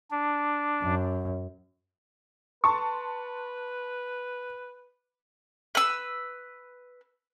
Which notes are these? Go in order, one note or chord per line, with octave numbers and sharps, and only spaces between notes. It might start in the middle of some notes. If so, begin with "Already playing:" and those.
D4
F#2
B4 A5 C6 C#6
B4 E6